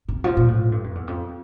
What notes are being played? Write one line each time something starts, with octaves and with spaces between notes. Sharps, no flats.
C3
F3
A#2
A2
G2
F2
E2
F2